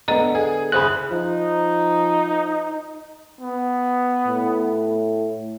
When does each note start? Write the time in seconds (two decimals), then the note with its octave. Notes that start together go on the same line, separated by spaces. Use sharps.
0.08 D3 B3 A4 D#5 A#5
0.35 G#4
0.72 F#1 G#4 C5 B5 F#6
1.11 F3 D#4
3.41 B3
4.28 A2